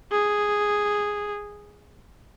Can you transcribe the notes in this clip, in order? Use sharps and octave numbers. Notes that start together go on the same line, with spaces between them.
G#4